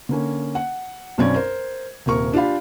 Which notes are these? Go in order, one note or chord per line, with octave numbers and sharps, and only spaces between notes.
D3 A#3 C#4
F#5
B1 F#2 C4 C#4 D5 G#6
A#4 C5
D#1 C3 A#4 C#6
D4 F4 G4 F5 B5